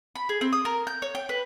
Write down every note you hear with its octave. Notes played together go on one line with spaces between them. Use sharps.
B5
G#4
C4
D#6
A#4
G6
C#5
G5
B4